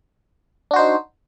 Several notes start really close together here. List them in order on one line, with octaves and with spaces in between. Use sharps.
D4 F#4 C5 D#4